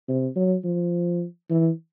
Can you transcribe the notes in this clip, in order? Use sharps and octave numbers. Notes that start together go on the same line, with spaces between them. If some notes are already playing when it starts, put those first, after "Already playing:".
C3
F#3
F3
E3